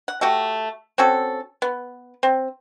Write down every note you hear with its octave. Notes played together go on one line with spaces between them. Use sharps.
F#5
A3 F#4 G4
C4 C#4 F#4 A4
B3
C4